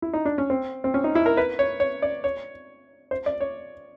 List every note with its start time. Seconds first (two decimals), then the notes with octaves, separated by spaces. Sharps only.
0.02 E4
0.13 D#4
0.25 D4
0.38 C#4
0.50 C4
0.84 C4
0.94 C#4
1.04 D#4
1.15 E4
1.26 A#4
1.37 B4
1.59 C#5
1.80 C#5
2.02 D5
2.24 C#5
3.11 C5
3.26 D5
3.41 C#5